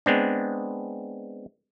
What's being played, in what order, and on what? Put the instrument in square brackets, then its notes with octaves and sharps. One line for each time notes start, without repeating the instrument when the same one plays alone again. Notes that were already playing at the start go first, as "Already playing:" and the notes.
[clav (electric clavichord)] G#3 B3 C4 D4